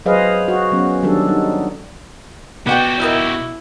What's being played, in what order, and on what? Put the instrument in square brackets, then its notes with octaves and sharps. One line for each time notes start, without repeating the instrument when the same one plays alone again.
[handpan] F#3 G#4 B4 C5 D#5 F5
F#4
F#3 B3 C#4
D#3 F#3 G3 D4 A4
G3 D#4
[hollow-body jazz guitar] B2 [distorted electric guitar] F#4 G4 [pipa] B4 F#5 G5 [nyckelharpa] D5
[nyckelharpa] E4 [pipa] A#4 D#5 E5